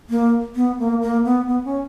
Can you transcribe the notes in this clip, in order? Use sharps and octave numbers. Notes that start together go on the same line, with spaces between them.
A#3
B3
A#3
A#3
B3
B3
C#4